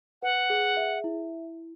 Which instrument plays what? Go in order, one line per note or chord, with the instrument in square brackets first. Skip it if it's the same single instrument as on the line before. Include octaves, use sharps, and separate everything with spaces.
[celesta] B4 [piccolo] F#5
[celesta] G#4
E5
E4